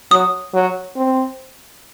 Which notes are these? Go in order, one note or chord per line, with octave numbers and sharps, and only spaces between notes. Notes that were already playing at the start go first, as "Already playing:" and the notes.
F#3 D#6
F#3
C4